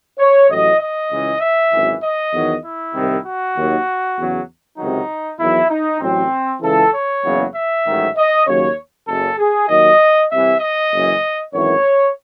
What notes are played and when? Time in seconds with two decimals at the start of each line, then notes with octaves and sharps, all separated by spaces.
0.19 C#5
0.49 A1 A2 F#3 D#5
0.80 D#5
1.10 C#2 C#3 E3
1.41 E5
1.72 G#1 F#2 E3
2.02 D#5
2.33 E2 D#3 F#3
2.64 E4
2.94 C2 C3 D#3
3.25 F#4
3.55 D#2 D#3 F#3
4.17 E2 C#3 F#3
4.78 C#2 C3 D#3 F#3 D#4
5.39 E2 D#3 F#3 E4
5.70 D#4
6.00 A1 A2 F#3 C4
6.62 C#2 C#3 E3 A4
6.93 C#5
7.23 F#1 E2 C#3 F#3
7.55 E5
7.84 A1 G#2 D#3 F#3
8.16 D#5
8.47 D#2 C#3 F#3 C#5
9.07 F#1 F#2 C#3 A4
9.38 G#4
9.68 D#2 D#3 F#3 D#5
10.30 C2 C3 E3 E5
10.60 D#5
10.91 F#1 F#2 E3
11.53 G#1 F#2 E3 C#5